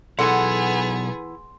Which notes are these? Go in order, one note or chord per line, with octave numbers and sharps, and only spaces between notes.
B1 E3 B3 G#4 A4 F#5 C6